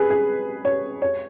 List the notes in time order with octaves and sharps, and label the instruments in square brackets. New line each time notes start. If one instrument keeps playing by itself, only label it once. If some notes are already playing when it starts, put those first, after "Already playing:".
Already playing: [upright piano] G#4 B4
G#4
C#5
C#5